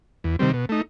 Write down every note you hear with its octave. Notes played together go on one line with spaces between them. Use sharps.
E2
C3 D#3 G3 C4
B2
A3 D#4